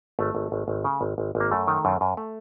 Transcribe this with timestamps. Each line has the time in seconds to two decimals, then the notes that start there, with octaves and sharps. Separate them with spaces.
0.19 G#1 A3
0.35 G#1
0.52 G#1
0.68 G#1
0.84 C#3
1.01 G#1
1.18 G#1
1.35 G#1
1.40 A#3
1.51 F#2 A3
1.67 D#3
1.85 F#2
2.01 F#2
2.17 A3